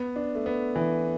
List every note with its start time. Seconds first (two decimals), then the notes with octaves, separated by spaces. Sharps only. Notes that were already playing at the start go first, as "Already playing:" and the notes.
Already playing: B3
0.16 D4
0.35 A3
0.46 B3
0.76 E3